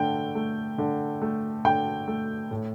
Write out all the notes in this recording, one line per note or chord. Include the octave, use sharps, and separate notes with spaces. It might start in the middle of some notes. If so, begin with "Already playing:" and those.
Already playing: D3 A3 G5
A3
D3
A3
D3 G5
A3
A2